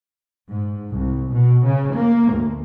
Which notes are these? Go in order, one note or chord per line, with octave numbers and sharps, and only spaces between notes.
G#2
C2
B2
C#3
A#3
D2